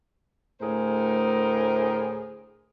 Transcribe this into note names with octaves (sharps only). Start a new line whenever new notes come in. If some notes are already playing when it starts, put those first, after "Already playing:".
D2 A2 G#4 A#4 C5